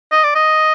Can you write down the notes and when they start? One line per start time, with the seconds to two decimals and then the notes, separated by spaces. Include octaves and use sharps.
0.12 D#5
0.24 D5
0.35 D#5